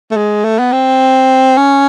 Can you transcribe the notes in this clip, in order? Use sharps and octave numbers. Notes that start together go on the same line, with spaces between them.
A3
G#3
A3
B3
C4
C#4